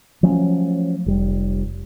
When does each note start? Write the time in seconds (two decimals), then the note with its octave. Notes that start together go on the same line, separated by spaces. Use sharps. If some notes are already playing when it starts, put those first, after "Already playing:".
0.23 F3 F#3 A3 C#4
1.06 F1 G3